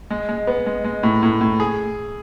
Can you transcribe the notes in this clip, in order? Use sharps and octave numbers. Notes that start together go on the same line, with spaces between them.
G#3
G#3
B3
G#3
G#3
A2
A2
A2
G#4